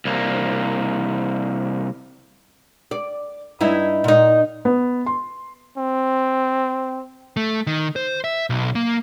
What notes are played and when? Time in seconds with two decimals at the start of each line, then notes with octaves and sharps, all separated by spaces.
0.05 C2 A#3
2.91 D5
3.60 G2 D#4 E4
4.04 A#2 D#4
4.65 B3
5.06 C6
5.77 C4
7.37 A3
7.67 D#3
7.96 C5
8.24 E5
8.50 B1
8.75 A#3